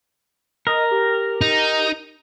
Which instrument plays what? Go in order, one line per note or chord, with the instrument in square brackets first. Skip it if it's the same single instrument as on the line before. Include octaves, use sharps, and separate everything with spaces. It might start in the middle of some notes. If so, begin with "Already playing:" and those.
[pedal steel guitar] A#4 [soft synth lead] D#5
[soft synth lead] G4
[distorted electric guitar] D#4